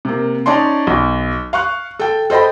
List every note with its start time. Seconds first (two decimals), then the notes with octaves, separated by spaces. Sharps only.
0.05 C3 A#3
0.46 C#4 D#4 D5 A5 C6
0.87 B1
1.53 F5 C#6 F#6
1.99 A4 G5
2.30 A4 C5 D#5 G5 B5